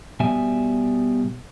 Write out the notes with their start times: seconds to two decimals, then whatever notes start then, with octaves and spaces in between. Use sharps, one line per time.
0.20 B2 G3 E5 G#5